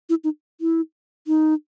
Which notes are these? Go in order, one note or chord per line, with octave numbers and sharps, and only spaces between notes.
E4
D#4
E4
D#4